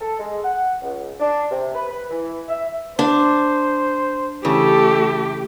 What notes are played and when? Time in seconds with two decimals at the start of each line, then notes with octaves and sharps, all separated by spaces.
0.01 A4
0.19 G#3
0.43 F#5
0.82 C#2
1.20 D4
1.50 C3
1.75 B4
1.89 B4
2.10 E3
2.48 E5
2.99 D4 C5
4.45 C#3 E3 A3 G4 A4